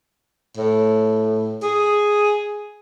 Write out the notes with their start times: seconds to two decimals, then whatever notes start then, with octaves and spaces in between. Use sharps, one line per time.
0.57 A2
1.63 G#4